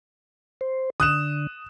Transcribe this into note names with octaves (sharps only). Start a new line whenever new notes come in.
C5
D3 D#6 F#6 E7